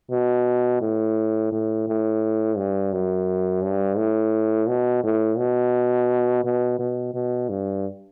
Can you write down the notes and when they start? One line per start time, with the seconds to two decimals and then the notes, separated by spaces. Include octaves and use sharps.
0.11 B2
0.81 A2
1.52 A2
1.88 A2
2.57 G2
2.93 F#2
3.63 G2
3.98 A2
4.68 B2
5.04 A2
5.38 B2
6.44 B2
6.79 B2
7.14 B2
7.49 G2